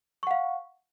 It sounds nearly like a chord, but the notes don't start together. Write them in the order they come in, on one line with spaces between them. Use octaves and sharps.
C#6 F#5 F5